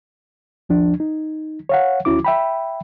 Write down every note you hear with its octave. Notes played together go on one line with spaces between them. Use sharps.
D#2 F3 D4
D#4
C#5 F5 F#5
D#2 C#4 E4 F#4 D6
E5 G5 B5